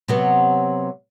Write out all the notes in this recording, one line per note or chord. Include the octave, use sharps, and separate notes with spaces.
C3 F#3 B3